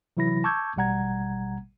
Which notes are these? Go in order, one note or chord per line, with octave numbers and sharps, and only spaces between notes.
C3 E3 F#3 E4 B5 A#6
A5 C#6 D6 E6 G6 G#6
A1 B2 G3 F#5 A#5 G#6